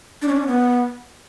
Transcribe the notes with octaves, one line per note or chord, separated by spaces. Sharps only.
D4
C#4
D4
C#4
B3